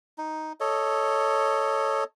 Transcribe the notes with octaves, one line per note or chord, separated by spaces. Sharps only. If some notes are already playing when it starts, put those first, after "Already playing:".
D#4
A4 C#5 D#5